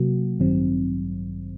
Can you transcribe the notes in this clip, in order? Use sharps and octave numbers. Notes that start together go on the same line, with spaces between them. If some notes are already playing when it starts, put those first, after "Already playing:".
Already playing: C3 F#3 A#3 F#4
A1 G2 D#3 F#3 C4